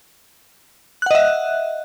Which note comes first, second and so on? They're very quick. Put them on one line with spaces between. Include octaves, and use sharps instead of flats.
F#6 F#5 D#5 E5